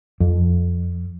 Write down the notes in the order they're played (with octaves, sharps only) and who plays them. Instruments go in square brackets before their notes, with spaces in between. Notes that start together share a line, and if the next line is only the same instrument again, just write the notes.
[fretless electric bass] F2